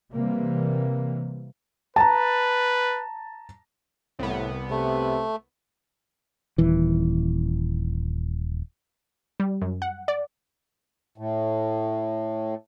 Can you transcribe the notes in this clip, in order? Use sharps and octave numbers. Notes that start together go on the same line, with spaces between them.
C3 E3 G3 A#3
B4 A5 A#5
C2 A2 B3
C3 A3
D#1 E3
G3
F#2
F#5
D5
A2